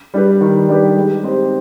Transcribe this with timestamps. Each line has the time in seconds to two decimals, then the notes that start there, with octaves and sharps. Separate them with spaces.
0.14 G3 D4 G4 B4
0.41 D#3
0.69 G3 D4 G4 B4
0.96 G#3
1.24 C4 D#4 G4 C5